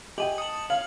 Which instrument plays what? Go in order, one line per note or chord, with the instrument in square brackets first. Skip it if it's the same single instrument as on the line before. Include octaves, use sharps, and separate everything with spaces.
[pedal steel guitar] G4 G#5 [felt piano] D#5 G5 [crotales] F#7
[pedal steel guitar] A5 D#6 [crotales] C#7 F#7
[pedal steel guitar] C#5 [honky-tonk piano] F5 [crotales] F#7